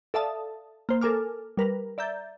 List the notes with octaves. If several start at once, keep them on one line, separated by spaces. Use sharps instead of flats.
A4 D5 E5 F5 A5 D#6
A#3 C5
A4 A#4 G#5 D6 F6
G3 A#4 B4
D5 E5 A#5 G6 A6